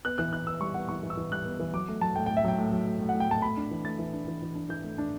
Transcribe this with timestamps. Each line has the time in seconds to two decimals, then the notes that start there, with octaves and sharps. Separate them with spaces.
0.05 B3 F#6
0.18 E3 F#6
0.33 E4 F#6
0.46 B3 E6
0.61 G3 C#6
0.74 B3 F#5
0.89 E3 C#6
1.03 E3
1.10 E6
1.17 E3
1.32 G3 F#6
1.45 B3
1.60 E3
1.73 F#3 D6
1.88 A3
2.01 F#3 A5
2.16 A2 G5
2.26 A2 G5
2.37 E5
2.44 F#3 G5
2.58 A2
2.72 F#3
2.87 A2
3.01 A2
3.09 F#5
3.14 A2
3.20 G5
3.29 A2 A5
3.42 A3 B5
3.57 D4
3.71 E3
3.85 A3 A6
3.99 E3
4.13 D4
4.27 E3
4.42 E3
4.55 D4
4.69 E3 G6
4.84 A3
4.98 D4